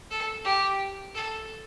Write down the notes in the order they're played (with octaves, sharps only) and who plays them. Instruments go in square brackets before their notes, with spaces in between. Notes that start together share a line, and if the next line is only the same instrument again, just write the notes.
[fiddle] A4
G4
A4